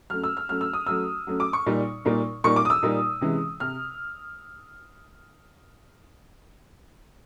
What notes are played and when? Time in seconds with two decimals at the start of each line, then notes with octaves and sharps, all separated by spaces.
0.10 F#3 A3 C#4 F6
0.24 E6
0.37 F6
0.49 F#3 A3 C#4 F6
0.61 E6
0.73 D#6
0.87 F#3 A3 C#4 E6
1.27 F#3 A3 C#4
1.40 D6
1.53 C#6
1.66 A#2 G3 A#3 D#4
2.05 A#2 G3 A#3 D#4
2.44 A#2 G3 A#3 D#4 C#6
2.56 D6
2.65 D#6
2.70 E6
2.82 A#2 G3 A#3 D#4
3.21 C3 E3 G#3 C#4
3.60 C3 F6